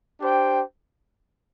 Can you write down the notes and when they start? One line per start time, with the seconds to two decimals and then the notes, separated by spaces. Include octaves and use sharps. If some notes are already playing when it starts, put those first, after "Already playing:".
0.21 D4 G4 C5 G5